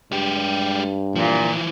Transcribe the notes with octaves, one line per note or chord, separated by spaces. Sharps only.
G2 G#3 G4
A#2 E3 F3